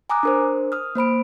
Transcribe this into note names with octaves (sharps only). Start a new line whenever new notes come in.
G#5 A#5 D6 D#6 F#6
D4 A#4 C5
D#6 F6
A#3 C5 B5 D7